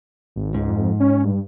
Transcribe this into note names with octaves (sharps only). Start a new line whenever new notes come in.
G#1
C#2 G#2
F2
C#4
G2